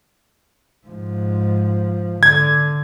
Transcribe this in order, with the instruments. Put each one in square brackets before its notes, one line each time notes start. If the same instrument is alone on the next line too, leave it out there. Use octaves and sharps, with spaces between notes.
[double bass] G#2 F3
[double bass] D3 [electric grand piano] G#6